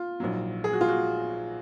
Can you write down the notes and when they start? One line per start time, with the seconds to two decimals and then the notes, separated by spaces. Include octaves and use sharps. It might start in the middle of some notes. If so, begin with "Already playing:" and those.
Already playing: F4
0.20 A#1 G#2 F#3
0.64 G#4
0.73 F#4
0.81 F4
0.89 F#4